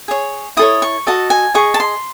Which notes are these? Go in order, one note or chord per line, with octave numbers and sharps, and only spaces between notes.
G#4 C#5
E4 A4 C#5 D#6
C#6
F#4 A4 D#5 A5
G#5
G#4 D#5 C#6
A5
C6